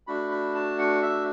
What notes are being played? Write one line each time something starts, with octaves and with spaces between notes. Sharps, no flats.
A3 D4 F#4 B5
B5
A5
F#5
E5